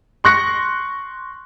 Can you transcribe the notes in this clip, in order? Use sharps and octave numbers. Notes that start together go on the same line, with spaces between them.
C6 C#6 F#6 A#6 C#7